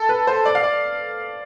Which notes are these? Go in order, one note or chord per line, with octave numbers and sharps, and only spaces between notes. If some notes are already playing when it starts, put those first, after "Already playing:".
Already playing: A4
B4
C5
D5
F5
D5